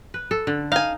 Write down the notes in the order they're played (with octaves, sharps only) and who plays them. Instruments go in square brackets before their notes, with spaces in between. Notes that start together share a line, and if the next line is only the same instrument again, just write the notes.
[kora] B4
A4
D3
[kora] D#4 [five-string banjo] F5 G#5